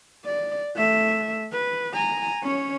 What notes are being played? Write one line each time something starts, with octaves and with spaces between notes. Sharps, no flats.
D5
A3 E5
B4
G#5 A#5
C#4 C#5